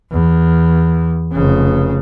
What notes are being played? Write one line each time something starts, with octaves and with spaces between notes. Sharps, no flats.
E2
F1 C#3